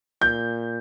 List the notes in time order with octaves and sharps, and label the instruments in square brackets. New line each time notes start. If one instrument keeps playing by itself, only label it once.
[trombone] A#2 [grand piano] G6